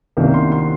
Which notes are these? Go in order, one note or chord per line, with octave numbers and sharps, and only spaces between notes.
C2 C3 D#3 A#3 C#4
C6
C6